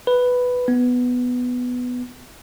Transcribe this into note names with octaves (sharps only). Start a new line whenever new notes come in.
B4
B3